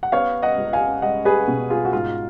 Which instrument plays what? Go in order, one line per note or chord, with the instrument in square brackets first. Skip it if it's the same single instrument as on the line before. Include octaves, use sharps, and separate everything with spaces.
[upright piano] F#5
B3 C#5 F5
D#5 F#5
C#2
F5 G#5
G#3 D#5 F#5
G#4 B4
B2
F4 G#4
F#4
G#2 F4